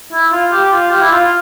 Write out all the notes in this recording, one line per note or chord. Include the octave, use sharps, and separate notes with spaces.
E4
F4
G4
F4
G4
E4
F4